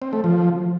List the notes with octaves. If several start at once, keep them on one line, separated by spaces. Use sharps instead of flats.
C4
A3
F3